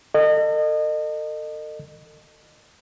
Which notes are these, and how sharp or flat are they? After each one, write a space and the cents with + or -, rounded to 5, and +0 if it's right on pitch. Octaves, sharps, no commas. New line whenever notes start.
A4 +40 D#5 -30